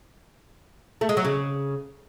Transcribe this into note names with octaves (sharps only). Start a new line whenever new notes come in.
A3
G#3
F#3
C#3